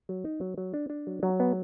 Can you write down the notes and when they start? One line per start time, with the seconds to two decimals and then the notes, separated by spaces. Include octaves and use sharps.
0.09 F#3
0.25 D#4
0.41 F#3
0.58 F#3
0.74 D4
0.90 D4
1.07 F#3
1.23 F#3
1.40 B3